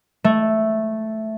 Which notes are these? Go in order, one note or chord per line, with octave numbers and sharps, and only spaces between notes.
A3